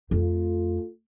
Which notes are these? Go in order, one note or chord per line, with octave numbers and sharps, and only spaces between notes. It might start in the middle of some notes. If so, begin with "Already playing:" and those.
F2 A3 F4 A4